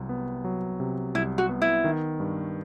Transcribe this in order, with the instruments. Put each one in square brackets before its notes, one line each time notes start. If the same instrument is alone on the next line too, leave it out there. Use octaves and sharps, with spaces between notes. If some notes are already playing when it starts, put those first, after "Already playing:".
Already playing: [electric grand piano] C2 C3 F#3
B3
F#3
C3
[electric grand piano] C2 [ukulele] E4
[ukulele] F#4
[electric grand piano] B3
[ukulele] E4
[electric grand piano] D#3
G2